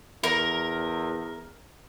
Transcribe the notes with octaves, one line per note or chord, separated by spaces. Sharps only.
E2 A#4